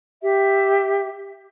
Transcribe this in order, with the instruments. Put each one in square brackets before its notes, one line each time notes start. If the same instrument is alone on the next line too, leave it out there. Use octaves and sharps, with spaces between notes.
[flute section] G4 E5